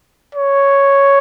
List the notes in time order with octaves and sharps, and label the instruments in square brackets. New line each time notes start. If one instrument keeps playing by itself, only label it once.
[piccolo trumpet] C#5